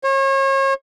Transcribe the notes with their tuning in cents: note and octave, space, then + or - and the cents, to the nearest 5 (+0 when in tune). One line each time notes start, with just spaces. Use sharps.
C#5 -35